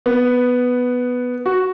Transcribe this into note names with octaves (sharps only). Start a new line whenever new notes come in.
B3
F#4